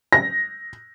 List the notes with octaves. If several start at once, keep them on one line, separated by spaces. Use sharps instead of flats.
A#6